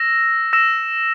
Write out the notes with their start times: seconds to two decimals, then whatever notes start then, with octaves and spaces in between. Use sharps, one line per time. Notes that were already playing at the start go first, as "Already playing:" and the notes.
Already playing: E6 A#6 E7
0.53 E6 A#6 E7